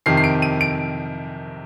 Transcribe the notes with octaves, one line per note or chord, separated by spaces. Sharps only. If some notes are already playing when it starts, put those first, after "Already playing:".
F2 C3 D#3 C7
C7
D7
D#7
D7